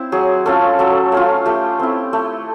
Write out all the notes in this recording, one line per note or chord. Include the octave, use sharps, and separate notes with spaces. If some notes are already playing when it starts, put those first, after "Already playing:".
Already playing: C4 E4
F#3 G#4
A3 C#4 F4 A4
F#3 A4
A3 C#4 F4
A3 G4
C4 E4
A3